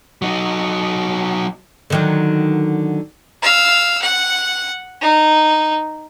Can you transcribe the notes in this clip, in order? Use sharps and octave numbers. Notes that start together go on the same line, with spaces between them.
F#3 D#4
D3 D#3 F#3
F5 E6
F#5
D#4